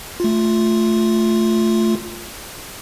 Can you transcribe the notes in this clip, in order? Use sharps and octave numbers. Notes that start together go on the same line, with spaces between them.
A3 F4